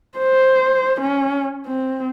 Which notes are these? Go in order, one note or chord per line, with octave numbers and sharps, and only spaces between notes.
C5
C#4
C4